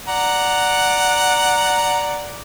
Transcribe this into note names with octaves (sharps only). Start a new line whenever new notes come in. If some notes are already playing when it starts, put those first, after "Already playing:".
D5 F#5 A#5